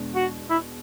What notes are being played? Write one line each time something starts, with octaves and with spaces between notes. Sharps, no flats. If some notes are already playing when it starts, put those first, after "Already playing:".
Already playing: E2 B2 G#3 D4
F#4
E4